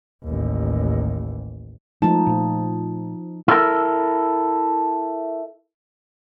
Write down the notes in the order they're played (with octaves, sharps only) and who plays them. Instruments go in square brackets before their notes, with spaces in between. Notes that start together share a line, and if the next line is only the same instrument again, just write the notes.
[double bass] A1 D#2
[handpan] F3 D#4 [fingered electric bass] G#3 A3 [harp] A5
[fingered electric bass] A#2 A3
[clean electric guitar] E4 A4 A#4